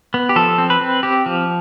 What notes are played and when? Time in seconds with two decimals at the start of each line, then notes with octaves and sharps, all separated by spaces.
0.14 B3
0.29 G4
0.36 F3 A4
0.58 C4
0.70 B4
0.81 C4
1.03 C4 G4
1.26 F3